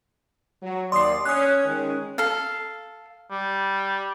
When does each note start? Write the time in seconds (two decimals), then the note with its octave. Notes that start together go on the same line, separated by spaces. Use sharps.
0.62 F#3
0.92 D#2 D5 C6 D#6 C7
1.25 C#4 D#6 F#6
1.65 D#3 G#3 C#4
2.18 A4 F5
3.31 G3